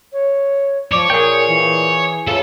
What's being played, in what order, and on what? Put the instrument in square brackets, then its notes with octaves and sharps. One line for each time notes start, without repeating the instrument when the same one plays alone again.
[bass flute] C#5
[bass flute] F3 [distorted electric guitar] C#5 [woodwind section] D6
[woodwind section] A#2 [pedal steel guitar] G#4 G5 [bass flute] A#4
[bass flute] E3
[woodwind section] C#3 E3 [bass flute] F4 [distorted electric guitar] A4